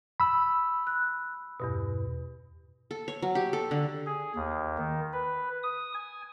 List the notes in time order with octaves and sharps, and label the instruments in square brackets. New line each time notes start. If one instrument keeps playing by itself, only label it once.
[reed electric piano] B5 E6
[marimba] F#6
E2 G2 B2
[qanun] A4
C#5
F#3
G4
A4
D3
[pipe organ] G#4
D#2
D#3
B4
D#6
G#5